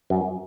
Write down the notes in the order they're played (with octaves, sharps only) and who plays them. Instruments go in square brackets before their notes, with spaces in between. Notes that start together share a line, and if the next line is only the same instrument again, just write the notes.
[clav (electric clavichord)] F#2